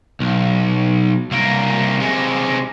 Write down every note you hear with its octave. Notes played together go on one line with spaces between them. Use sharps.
B1
C2 A#3
C3 G#3